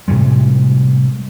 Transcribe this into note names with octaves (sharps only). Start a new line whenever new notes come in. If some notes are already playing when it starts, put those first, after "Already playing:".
A2 C3 G3 G#3